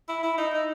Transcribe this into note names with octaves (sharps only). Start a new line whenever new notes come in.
E4
E4
D#4
D#4